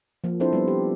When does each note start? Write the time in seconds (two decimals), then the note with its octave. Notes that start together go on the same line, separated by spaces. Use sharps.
0.24 F3 A#3
0.40 C4 D4 E4 A4 C5
0.53 G3 B3 B4
0.68 G4